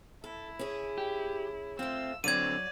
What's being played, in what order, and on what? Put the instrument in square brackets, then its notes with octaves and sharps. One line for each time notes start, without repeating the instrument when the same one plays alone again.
[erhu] E4 [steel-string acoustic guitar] A4
[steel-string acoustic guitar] C#4 G#4
[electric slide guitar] G4
[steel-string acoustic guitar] A3 F4 [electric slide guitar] C4 [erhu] E6
[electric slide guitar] D3 C4 [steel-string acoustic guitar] F#3 C#5 [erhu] D5 [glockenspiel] G#6 D#7